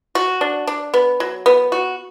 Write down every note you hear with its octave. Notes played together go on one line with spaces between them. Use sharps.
F#4
D4
D4
B3
F#3
B3
F#4